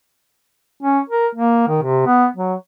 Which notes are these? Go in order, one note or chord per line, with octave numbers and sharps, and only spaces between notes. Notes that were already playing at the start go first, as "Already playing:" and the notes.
C#4
A#4
A#3
D#3
C3
B3
F#3